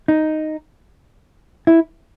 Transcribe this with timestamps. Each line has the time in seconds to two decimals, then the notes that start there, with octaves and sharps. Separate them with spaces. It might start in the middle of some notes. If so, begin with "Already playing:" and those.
0.08 D#4
1.67 E4